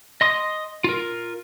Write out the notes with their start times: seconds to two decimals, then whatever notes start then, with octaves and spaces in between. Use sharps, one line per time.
0.21 D#5 C6 D#6
0.84 F4 A#4